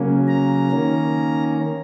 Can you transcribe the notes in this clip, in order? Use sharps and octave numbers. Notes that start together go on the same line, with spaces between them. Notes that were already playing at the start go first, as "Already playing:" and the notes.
Already playing: C#3 F#3 A#3 C#4
A#5
D#3 A#3 C#4